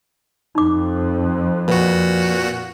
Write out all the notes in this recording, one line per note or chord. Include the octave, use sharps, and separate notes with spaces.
F2 D#4 D6
A#2 F3 F#4 B4